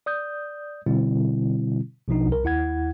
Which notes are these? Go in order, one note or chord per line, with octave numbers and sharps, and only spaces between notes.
D5 D#6 G6
B2 D3 G3 C4 E4
A#1 B2 F3 D4 D#4
C2 A#4
D#2 E4 F#5 G#6